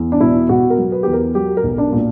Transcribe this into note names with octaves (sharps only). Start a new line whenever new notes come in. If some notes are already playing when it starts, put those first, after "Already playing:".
Already playing: E2
D4
B2 E4
B2 F#4
A#4
F#3
B4
E2 G4
A#4
F#3 G4
A#4
B1
D4
A#2